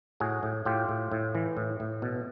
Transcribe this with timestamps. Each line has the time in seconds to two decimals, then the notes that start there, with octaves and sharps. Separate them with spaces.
0.20 A2 F#4 G#4
0.43 A2
0.65 A2 F4 G4
0.89 A2
1.12 A2
1.35 E3
1.57 A2
1.80 A2
2.02 B2